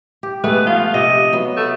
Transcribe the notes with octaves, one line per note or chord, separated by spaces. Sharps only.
G4
G#3 A3 B3 B4
F3 F4
C3 D#5
F#3 B3
A3